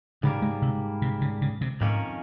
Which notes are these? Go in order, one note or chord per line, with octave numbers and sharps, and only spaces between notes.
G#2 C#3 G3 A#3
G#3
C3
C3
C#3
C#3
C3
F2 G#2 D#3 A#3 C#4